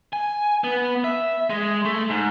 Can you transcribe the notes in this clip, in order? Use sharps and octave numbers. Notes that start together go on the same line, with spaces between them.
G#5
B3
E5
G#3
A3
G#2